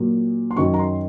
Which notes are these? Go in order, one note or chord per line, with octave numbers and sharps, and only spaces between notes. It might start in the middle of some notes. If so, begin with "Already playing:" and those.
Already playing: A#2 F#3
C6
F#2 D#3 F#3 C#6
A#5
C6